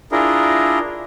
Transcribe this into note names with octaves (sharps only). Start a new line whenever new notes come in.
D4 E4 F4 G#4 A#4